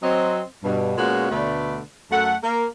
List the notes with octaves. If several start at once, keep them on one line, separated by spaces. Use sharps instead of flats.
F#3 C4 D#5
G2 B2
A#2 G#3 B3 C#4 F4 F#4
D2 B2 D3 A3 B4 D5
F#2 A3 A4 F#5
A#3 A#4